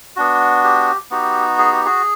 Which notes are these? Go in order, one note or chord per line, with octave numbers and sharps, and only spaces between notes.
B3 D4 F#4
G4
B3 D#4 F#4 G4
G#4
G4
F#4 G#4